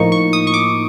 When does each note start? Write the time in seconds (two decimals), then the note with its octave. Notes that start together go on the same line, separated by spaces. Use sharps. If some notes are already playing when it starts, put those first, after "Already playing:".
Already playing: A2 F3 A#3 D#4 C#6
0.12 C#6
0.33 D#6
0.47 C#6
0.54 D6